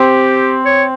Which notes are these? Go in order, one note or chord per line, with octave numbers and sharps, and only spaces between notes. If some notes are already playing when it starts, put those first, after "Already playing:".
Already playing: C4 G4
C#5